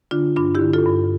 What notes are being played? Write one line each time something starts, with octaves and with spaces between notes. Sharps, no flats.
D3 D4 F4
G2 D4 F4
E4 G4
D3
F4 A4
G2